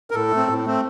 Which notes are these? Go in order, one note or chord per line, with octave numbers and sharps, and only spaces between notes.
A#4
A2 A4
A3
C4
A2
A3 C4